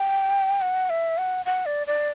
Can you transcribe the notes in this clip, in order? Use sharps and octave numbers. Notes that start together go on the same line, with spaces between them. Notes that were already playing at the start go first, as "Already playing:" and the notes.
Already playing: G5
F#5
E5
F#5
F#5
D5
D5